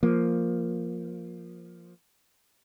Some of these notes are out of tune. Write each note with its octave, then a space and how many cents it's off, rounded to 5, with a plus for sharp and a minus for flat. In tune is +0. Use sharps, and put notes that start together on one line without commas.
F3 +0 A#3 +0